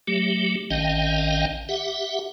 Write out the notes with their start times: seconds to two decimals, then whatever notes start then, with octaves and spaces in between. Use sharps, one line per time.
0.07 F#3 A3 G4
0.70 A1 D#3 C#4 D#5 F5 G5
1.69 G4 E5 F#5